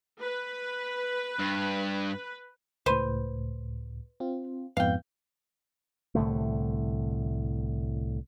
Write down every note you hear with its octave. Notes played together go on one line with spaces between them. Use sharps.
B4
G2
C#2 A2 B4 C5
C4 F4
F2 G#2 B3 F5 G5
C2 A2 D3 A3